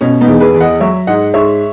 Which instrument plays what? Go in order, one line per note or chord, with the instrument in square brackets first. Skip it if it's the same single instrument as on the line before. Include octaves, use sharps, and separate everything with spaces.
[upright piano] B2 C#4
B3 D#4
E2
G#4 B4
E2
D#5 F#5
F#3 C#5 E5
G#2 D#5 F#5
G#2 C#5 E5